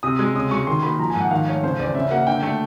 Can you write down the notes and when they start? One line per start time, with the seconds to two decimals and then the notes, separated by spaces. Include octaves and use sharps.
0.03 C3 D#6
0.19 G#3
0.35 C#3 D#6
0.51 G#3 C#6
0.67 D#3 C6
0.83 A#3 B5
0.99 F3 A#5
1.10 G#2 G#5
1.20 F#5
1.31 D#3 F5
1.47 A3 C#5
1.64 C#3 C5
1.79 E2 D5
1.95 C#3 E5
2.11 A#3 F#5
2.27 D3 G5
2.43 A3